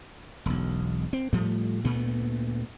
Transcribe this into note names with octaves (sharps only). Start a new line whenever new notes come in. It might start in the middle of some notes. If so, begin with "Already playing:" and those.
E1 B1
C4
A2 F3 G3 A3
D2 A#2 A3 B3